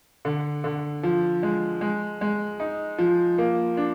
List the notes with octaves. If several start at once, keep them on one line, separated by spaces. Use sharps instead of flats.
D3
D3
F3
G#3
G#3
G#3
D#4
F3
A#3
D4